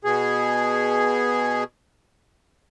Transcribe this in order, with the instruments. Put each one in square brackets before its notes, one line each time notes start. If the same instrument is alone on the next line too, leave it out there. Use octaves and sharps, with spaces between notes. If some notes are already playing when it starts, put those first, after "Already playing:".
[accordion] B2 G#4